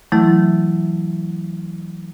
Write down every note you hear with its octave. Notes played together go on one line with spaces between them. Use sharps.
E3 F#3 A3 E4